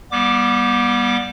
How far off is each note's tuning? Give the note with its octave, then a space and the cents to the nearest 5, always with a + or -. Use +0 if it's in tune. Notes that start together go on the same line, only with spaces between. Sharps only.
G3 +0 B3 -35 D6 +0